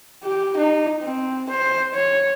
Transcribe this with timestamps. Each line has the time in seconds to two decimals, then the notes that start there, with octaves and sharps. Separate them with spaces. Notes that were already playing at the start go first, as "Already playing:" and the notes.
0.24 G4
0.57 D#4
1.02 C4
1.50 C5
1.94 C#5